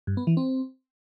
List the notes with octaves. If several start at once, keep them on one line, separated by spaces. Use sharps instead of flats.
G2
B3
E3
C4